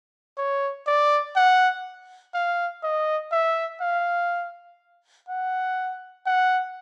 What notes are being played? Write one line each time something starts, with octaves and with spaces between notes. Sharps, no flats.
C#5
D5
F#5
F5
D#5
E5
F5
F#5
F#5